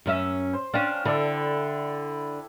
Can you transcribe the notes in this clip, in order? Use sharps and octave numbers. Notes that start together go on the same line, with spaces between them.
F#2 C#4 E5
C5
C#4 D4 F5 G5
D3 E4 A4 D5